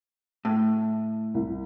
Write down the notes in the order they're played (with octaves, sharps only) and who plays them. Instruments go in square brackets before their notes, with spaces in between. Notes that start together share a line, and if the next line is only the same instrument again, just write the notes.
[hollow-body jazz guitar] A2
[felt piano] C2